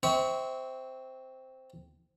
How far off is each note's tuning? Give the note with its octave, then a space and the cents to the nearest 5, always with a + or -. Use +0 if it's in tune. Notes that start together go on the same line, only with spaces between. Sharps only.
C4 -5 E5 -30 C#6 +15